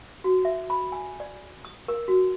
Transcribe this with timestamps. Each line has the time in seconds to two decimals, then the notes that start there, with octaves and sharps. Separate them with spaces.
0.24 F#4
0.45 E5
0.70 B5
0.92 G#5
1.20 D5
1.65 D#6
1.88 A#4
2.08 F#4